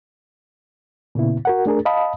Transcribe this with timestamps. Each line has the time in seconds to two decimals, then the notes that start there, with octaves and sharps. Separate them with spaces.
1.15 A#2 C#3 B3 E4
1.45 F#4 A#4 F#5
1.66 A3 D4 G#4 A#4
1.85 D#5 F5 A5 B5 D#6